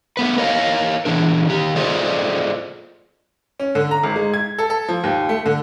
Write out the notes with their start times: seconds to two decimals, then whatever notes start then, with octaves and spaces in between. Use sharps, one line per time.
0.17 A3 B3 B4
0.38 A#4 C#5 D#5 F5
1.05 A#2 D#3 E3 D4 A#4
1.49 D#3 G4
1.76 F4 G#4 A4 C5 D5 D#5
3.60 C#4
3.75 D3
3.91 A#5
4.04 G#1
4.16 G#3
4.34 G#6
4.58 A4
4.70 A4
4.88 F3
5.04 D#2
5.29 A3
5.46 D3